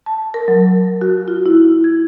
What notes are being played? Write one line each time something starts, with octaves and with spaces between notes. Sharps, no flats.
A5
A#4
F#3
F#4
F4
E4
G#6